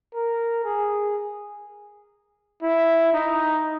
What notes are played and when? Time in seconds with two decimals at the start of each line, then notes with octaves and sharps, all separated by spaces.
0.15 A#4
0.65 G#4
2.62 E4
3.13 D#4